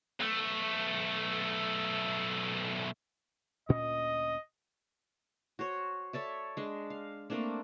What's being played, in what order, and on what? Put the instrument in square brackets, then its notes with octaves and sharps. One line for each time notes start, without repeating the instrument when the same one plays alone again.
[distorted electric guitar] B1 A3
[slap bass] D2 A#2 C#4 [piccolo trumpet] D#5
[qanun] F#4 C5 C#5
A4 C#5 D5 E5
G#3 D4
F5
A3 A#3 C4 D4